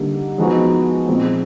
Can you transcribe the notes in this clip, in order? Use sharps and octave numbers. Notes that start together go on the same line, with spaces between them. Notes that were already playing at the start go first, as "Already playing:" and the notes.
Already playing: D3 G3 A#3 D#4
F3 G#3 B3 D#4 F#4
A#2 F3 G#3 C4